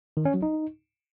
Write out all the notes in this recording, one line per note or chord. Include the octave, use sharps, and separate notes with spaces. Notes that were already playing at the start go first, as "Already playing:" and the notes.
D#3
C#4
F#3
D#4